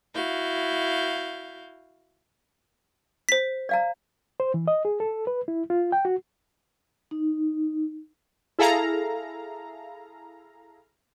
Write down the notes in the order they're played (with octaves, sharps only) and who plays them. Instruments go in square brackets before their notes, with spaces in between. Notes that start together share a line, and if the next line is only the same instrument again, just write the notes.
[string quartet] E4 F#4 F5 G6
[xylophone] C5 B6
[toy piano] D5 F5 A#5
[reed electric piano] C5
E3
D#5
G#4
A4
B4
E4
F4
G5
F#4
[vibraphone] D#4
[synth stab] E4 G#4 A4 F5 A#5